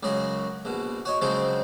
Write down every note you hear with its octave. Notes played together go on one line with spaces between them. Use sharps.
C#2 F#2 C#3 F#4 G#4
A#1 B2
F#4 C#5 D#5
C#3 F3 F#3 G#3 C4